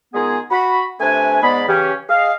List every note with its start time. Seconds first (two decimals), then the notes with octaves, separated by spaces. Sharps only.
0.14 D#3 G#3 B3 F4 G#4
0.51 F#4 B5
1.00 C3 A3 D4 B4 G#5
1.43 G#2 G#3 B3 D5 B5
1.68 C#3 E3 C#4 G4
2.09 G#4 D#5 F5